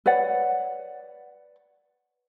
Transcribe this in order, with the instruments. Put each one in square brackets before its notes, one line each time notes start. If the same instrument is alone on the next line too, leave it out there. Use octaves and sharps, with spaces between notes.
[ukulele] B4 C#5 D5 F#5